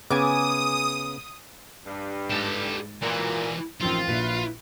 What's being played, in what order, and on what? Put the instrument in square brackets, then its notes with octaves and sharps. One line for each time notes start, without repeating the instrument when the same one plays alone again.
[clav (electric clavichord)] C#3 B3 [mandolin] G#5 D6 [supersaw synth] D#6
[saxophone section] G2
[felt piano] G#2 A6 A#6 [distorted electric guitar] G4 A4
[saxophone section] A#2 [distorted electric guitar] E3 F#4
[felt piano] A1 F3 [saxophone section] D#3 C4 [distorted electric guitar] F4
[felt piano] A#1 A#2 [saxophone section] F#3 E4 B4